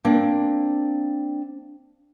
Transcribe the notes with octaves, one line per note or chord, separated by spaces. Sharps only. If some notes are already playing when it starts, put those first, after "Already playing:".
A#3 C4 D4